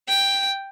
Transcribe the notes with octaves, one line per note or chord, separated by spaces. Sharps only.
G5